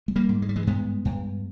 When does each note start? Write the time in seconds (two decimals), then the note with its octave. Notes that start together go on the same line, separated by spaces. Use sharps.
0.08 G#3
0.16 G3 A#3
0.29 G#2
0.42 G#3
0.49 G3
0.56 E3 G#3
0.67 G2 G#3 B3
1.05 G2